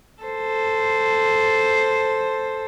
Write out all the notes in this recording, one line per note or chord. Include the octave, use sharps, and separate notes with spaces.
A4 C5